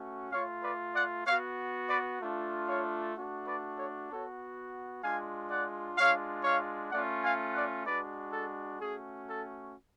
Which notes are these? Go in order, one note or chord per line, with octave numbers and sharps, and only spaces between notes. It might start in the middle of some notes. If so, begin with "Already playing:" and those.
Already playing: A3 C#4 F#4
A3 F4 C#5 F5
B4 D5
D5 F#5
B3 F#4 C#5 F5
B4 D5
A3 D4 F4
C#5 F5
A3 D4 F#4
B4 D5
A4 C#5
B3 F#4 A4 C#5
G#3 D4 F4 F5 G#5
D5 F#5
G#3 D4 F4 C#5 F5
C#5 F5
A3 C#4 F4 D5 F#5
F5 G#5
D5 F#5
G#3 D4 F#4 B4 D5
A4
A3 C#4 F#4 G#4
A4